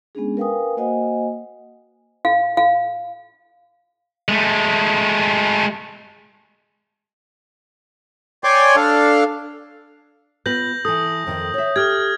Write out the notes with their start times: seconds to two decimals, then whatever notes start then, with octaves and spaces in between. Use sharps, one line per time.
0.15 G#3 B3 C#4 D4 G#4
0.37 A#4 B4 F5 G5 G#5 D#6
0.77 A#3 F#4 C5 D#5 F#5 G#5
2.25 F5
2.57 F5
4.29 G#3 A3
8.44 C#5 D5 G5 G#5 C6 D6
8.76 D4 A4 F5
10.46 B3 F4 B4 G6 A#6 F#7
10.85 E3 A4 D#6
11.27 F2 D#3 D#5
11.54 C#5 E5
11.76 G4 A4 F6 G#6